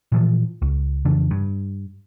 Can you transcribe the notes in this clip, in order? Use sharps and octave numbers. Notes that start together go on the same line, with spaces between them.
A#2 E3 F3
C#2
F2 C#3 E3 D4
G2